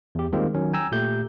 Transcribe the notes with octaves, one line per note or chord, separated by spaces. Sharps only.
E2 G4
D#3 G3 G#3 A#3 C4 F4
D#3 F#3 C#4
G5 G#5 A#5 E6
A#2 A3 G4 G6